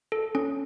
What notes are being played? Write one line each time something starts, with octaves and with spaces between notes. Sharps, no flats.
A4
C#4